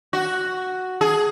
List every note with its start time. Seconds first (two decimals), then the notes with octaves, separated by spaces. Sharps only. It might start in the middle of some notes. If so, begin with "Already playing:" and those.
0.13 F#4
1.01 G#4